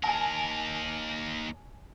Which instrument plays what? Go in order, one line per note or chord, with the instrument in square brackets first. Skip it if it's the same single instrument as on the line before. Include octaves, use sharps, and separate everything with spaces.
[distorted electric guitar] D#2 A#4 [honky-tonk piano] G#5 A5